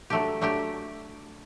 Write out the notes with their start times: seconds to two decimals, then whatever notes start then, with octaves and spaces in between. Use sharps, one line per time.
0.10 F#3 A3 D4 G4
0.41 F#3 A3 D4 G4